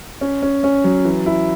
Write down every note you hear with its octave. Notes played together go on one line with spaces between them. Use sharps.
C#4
C#4
C#4
F#3
E3
E4